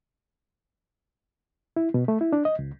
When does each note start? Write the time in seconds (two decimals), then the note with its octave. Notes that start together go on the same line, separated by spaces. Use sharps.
1.76 E4
1.94 B2
2.08 A3
2.21 E4
2.33 D4
2.45 D#5
2.59 C#2